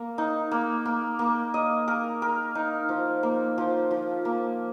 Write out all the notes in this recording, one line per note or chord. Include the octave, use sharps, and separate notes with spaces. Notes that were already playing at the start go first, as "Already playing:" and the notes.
Already playing: A#3 A#4
D#4
A#3
A#3
A#3
D#5
A#4
A#4
D#4
F3
A#3
F3
F3
A#3